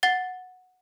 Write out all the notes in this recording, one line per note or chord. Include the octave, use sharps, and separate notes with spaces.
F#5 A6 G7